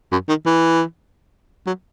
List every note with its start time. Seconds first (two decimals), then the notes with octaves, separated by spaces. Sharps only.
0.12 F#2
0.29 D#3
0.46 E3
1.67 F#3